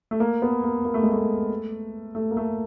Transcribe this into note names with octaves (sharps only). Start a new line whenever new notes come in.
A3
A#3
B3
A#3
A#3
A3
G#3
A3
A3
A#3
A3